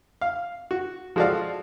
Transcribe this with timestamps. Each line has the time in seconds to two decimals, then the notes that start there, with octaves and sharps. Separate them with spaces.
0.21 F5
0.71 F#4
1.16 F3 G#3 F#4 A4 D5 F5